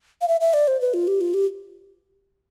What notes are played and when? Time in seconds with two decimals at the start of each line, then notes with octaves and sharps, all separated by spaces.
0.21 F5
0.28 E5
0.41 E5
0.54 D5
0.68 C5
0.81 B4
0.94 F4
1.07 G4
1.21 F4
1.34 G4